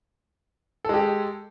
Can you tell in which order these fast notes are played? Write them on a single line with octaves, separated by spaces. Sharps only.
A4 G#3 G4